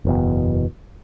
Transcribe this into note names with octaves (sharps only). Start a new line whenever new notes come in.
F#1 E2 B2